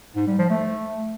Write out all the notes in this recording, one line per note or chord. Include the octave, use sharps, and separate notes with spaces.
G#2
G3
F3
A3